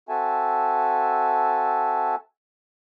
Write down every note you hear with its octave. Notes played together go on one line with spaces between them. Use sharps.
C4 F#4 A4 E5 G#5 A5